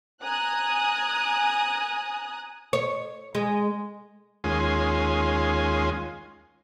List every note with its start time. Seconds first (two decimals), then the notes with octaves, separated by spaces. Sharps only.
0.23 G#5 A#5 D#6 F#6
2.73 C#5
3.35 G#3
4.44 D#2 G#3 C#4 F4 G#5 C6